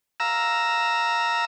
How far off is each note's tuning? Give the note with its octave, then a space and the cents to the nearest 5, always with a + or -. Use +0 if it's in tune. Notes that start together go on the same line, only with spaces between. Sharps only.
F5 +5 A#5 +0 E6 +0